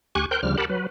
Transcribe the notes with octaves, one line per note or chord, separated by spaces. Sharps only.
D2 G4 G#5 C#6 F#6
A#4 C5 G5 F#6 G6
D2 C#3 F3 G3 F6
G4 A#4 F#5 A5 B5
F#3 B4